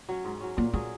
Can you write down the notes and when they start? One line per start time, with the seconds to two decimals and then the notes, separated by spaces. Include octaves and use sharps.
0.09 F#3 C#4
0.25 G#2
0.40 F#3 C#4
0.57 A#2 A#3
0.73 F#3 G#3 C#4 G#4